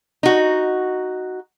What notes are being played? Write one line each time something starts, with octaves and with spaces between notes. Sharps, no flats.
D#4 F#4